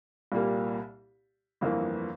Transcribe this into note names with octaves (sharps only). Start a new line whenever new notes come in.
C2 A#2 G3 A#3
G1 F2 E3 A#3